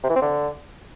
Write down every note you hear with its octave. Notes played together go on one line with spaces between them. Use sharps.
C3
E3
C4
D3